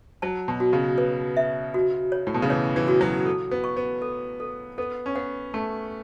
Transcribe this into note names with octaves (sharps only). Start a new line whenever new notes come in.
F#3 A5
B2
F#4
C#3
B4
E5
F#4
C#5
A2
B2
C#3
E3 C#5
E3
F#4
F#3
A4
B3
C#6
B3
A4
A4
B3 A4
C#4
B3 F#5
A3 A5